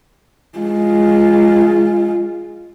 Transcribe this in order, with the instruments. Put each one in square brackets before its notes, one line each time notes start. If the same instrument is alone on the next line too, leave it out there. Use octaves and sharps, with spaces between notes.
[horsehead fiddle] G#3 F4